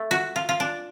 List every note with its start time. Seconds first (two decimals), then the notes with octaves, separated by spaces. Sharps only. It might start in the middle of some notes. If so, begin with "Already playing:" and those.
Already playing: A3
0.11 F#4
0.36 F4
0.49 F4
0.60 D4